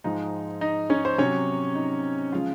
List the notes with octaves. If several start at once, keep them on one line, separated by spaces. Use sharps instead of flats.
G#2 F3 G#3 D#4 D#5
D#4 D#5
C#4 C#5
C5
C3 F#3 C#4 C#5
D#4 D#5
C#3 F3 G#3 F4 F5